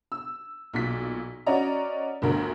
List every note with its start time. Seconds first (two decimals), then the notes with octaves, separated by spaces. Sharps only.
0.12 E6
0.74 B1 A#2 B6
1.46 C#4 F#4 D5 D#5 A#5
2.22 G1 D2 A#4